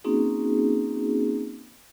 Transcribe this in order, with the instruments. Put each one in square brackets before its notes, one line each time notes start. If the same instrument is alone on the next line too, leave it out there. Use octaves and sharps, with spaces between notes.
[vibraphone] A#3 C4 C#4 D#4 F#4 G#4